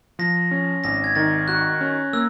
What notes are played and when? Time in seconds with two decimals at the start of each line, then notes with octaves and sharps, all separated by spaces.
0.19 F3 A#6
0.51 C#4
0.84 G#1 A#6
1.04 G#6
1.15 D#3 A6
1.48 F#4 F#6
1.81 C#4
2.13 A#3 E6